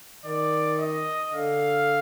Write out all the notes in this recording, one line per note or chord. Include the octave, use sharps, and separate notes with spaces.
D#3 D5
D#5
D3 F5